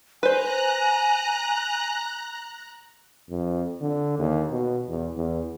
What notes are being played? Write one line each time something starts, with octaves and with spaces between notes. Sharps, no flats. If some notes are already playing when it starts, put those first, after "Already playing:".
B4 C5 G#5 A#5 F#6
F2
D3
D#2
B2
E2
E2